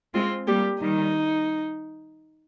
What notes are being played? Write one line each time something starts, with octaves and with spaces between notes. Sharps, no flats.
G#3 C4 F4
G3 A#3 G4
D#3 G3 D#4